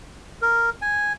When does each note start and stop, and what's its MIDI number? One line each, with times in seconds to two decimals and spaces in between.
0.42 0.70 70
0.82 1.13 80